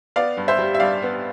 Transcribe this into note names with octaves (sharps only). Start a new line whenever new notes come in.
B3 D5 F5
G2
C5 E5
G3
E5
G2 D5 F5
B3